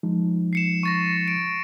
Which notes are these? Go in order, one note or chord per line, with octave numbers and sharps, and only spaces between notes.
F3 G#3 D#4
C7 C#7 E7
C#6 A6 A#6
D7